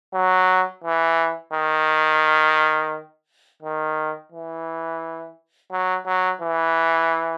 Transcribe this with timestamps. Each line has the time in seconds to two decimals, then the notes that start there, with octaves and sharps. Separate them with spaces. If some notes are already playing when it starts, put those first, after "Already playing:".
0.14 F#3
0.84 E3
1.53 D#3
3.62 D#3
4.32 E3
5.72 F#3
6.06 F#3
6.41 E3